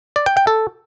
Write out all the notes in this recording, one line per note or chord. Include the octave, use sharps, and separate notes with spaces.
D5
G5
G5
A4